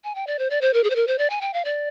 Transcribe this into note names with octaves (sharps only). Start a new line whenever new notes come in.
G#5
G5
D5
C5
D5
C5
A#4
G#4
C5
A#4
C5
D5
G#5
G5
F5
D5